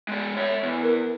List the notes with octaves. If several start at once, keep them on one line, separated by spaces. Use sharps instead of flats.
G#3 D5
C#5 E5
E2
A#4